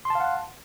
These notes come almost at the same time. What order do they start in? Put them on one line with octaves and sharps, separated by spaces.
C6 A5 F5 F#5